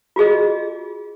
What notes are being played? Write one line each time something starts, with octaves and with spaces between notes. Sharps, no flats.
F4 F#4 G#4 D#5